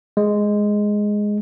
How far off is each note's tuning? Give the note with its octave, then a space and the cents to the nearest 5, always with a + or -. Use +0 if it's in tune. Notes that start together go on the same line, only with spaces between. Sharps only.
G#3 +0